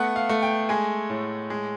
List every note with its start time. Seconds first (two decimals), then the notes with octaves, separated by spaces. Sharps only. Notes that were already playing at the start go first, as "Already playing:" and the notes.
Already playing: A3 B3 F#5
0.16 F5
0.29 A3
0.43 G5
0.69 G#3 G#5
1.10 A2
1.50 G#3